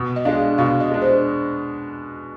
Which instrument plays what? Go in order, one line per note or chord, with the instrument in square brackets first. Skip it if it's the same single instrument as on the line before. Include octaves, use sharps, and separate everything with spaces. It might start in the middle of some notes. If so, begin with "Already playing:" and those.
Already playing: [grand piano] B2
[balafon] D#5
[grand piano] G#3 D4 [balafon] F5
[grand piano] B2 [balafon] F5
[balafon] D#5
[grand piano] G#3 D4
[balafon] C5